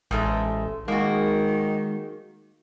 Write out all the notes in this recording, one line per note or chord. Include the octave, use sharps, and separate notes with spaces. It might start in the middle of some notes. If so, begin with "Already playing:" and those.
A1 G#2 G#3 A3
D#3 G#3 A#3 F#4